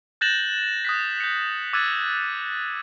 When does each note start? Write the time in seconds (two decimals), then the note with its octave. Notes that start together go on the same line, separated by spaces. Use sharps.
0.21 F#6 G6 A6 A#6 E7 F#7
0.85 D#6 F#6 B6
1.20 G6 C#7
1.73 D6 E6 F#6 G#6 A6 D#7